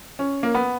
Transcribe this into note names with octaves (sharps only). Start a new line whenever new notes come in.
C#4
A#3
B3